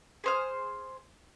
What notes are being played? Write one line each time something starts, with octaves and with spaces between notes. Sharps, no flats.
G#4 C5 F6